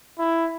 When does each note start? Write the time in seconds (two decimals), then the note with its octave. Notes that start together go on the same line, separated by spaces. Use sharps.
0.19 E4